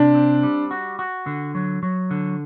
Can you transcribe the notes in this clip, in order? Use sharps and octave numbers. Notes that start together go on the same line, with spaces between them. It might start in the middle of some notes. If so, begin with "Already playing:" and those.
Already playing: C3 D4
C4
G3
F#4
F#4
D3
F#3
F#3
D3